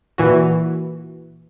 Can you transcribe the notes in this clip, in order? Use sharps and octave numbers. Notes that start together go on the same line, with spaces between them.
A#2 E3 F#4